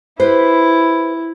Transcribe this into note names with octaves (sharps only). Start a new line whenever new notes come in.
E4 G4 B4 C5